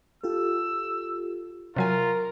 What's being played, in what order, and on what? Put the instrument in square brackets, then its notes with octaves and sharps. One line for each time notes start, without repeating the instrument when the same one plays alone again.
[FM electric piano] F4 G4 A4 [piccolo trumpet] E6
[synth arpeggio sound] C3 F#3 G#5 [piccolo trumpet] F4 [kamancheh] A#4